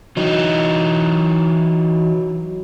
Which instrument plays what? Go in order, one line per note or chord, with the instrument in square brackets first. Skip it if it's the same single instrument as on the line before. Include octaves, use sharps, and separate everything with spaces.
[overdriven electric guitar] E3 D#4 [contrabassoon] F#3